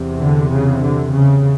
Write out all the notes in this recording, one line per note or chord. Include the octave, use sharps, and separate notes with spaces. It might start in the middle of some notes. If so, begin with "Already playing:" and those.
Already playing: E2 C3
D3
C#3
D3
C#3